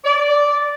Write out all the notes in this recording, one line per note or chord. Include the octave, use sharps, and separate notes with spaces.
D5